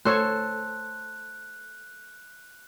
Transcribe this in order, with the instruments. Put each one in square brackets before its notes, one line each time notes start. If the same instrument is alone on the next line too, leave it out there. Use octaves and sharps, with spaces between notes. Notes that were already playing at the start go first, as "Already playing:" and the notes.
[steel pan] A3 C#5 [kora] A4 C5 [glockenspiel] F#6